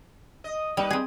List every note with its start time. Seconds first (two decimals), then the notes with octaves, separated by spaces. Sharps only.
0.44 D#5
0.77 G3 A#3 D#4 B4
0.91 C4 G#4